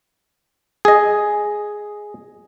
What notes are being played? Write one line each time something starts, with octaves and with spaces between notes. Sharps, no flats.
G#4 D#5